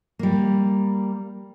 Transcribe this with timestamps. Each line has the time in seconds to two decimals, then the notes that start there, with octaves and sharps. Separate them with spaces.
0.19 G3 A#3